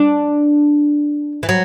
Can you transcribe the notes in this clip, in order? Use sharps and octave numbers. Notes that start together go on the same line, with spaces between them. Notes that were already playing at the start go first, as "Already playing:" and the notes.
Already playing: D4
E3
F#3